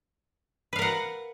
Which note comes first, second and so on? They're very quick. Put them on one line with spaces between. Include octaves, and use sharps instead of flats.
B4 F5 A#4 F#5